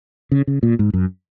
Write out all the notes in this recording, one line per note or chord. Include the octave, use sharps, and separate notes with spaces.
C#3
C#3
A#2
G#2
F#2